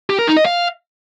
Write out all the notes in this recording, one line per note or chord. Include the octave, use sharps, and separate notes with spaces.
G4
A#4
D#4
D#5
F5